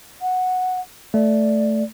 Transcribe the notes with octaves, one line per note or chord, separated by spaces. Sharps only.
F#5
A3 D5